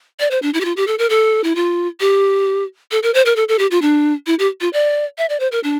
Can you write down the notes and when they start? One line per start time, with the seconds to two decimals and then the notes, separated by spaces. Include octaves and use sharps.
0.20 D5
0.31 C5
0.42 D4
0.54 E4
0.61 G4
0.65 F4
0.77 G4
0.87 A4
0.99 A#4
1.10 A4
1.44 E4
1.56 F4
2.00 G4
2.91 A4
3.03 A#4
3.14 C5
3.26 A#4
3.36 A4
3.49 A4
3.59 G4
3.71 F4
3.82 D4
4.27 E4
4.39 G4
4.61 F4
4.73 D5
5.18 E5
5.29 D5
5.40 C5
5.52 A#4
5.64 D4